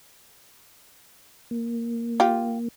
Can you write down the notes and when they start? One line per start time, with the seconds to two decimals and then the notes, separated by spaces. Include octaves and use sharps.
1.51 A#3
2.20 F4 G4